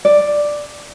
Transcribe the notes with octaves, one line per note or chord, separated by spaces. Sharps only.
D5